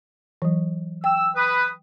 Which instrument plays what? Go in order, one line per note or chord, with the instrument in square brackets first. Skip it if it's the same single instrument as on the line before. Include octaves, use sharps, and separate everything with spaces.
[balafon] E3 F#3
[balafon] G5 [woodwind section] E6
[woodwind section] B4 D#6